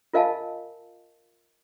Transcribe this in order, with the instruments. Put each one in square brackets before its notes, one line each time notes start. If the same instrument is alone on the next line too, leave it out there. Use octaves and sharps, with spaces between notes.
[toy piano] F4 A#4 D#5 F5 G#5 A5